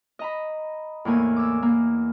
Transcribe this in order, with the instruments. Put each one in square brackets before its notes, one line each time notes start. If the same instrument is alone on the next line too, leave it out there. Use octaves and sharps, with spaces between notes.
[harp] D#5 A#5 B5
E2 A2 A#3 G#5
D6 E6
A#3